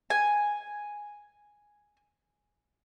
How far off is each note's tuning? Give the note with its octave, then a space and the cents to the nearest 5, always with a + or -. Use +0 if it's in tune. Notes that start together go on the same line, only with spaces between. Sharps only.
G#5 +0